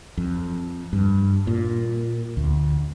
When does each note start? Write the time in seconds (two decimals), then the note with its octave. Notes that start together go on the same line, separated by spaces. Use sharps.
0.17 F2
0.93 G2
1.47 A#2
2.37 D2